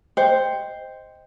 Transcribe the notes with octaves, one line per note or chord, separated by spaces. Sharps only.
C5 D#5 G5